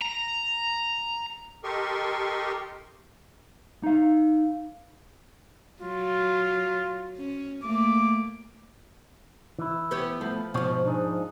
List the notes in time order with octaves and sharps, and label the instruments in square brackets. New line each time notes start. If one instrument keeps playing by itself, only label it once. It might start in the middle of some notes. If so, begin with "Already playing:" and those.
[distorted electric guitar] A#5
[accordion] G4 A4 A#4 D#5 C6 C#6
[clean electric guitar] D#4 F5
[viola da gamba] F#3 [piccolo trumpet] F4
[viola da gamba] C#4
[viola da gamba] A3 A#3 [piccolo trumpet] D6
[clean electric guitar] E3 E4
[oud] B3 G4 C#5
[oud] F3 [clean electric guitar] A3 B3
[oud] G#2 F3 [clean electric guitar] B2 F#4 C#5
[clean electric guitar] D4 D#4 G#4